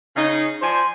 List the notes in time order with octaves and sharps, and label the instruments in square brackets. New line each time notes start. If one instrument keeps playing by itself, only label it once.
[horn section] C#3 D#4
[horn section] F3 D5 G#5 [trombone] C5